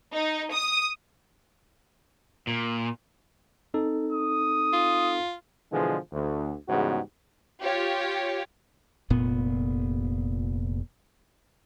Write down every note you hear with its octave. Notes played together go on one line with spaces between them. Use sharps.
D#4
D#6
A#2
C4 D#4 A4
D#6
F4
B2 D3 E3 F3 G#3
D2
E2 G#2 C#3 G3 B3 F#4
F4 G4 C#5
F1 A#2 B3